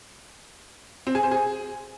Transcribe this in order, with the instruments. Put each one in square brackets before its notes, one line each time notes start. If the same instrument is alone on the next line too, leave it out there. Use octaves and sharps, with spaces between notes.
[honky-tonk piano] C4
G#4
C5
G#4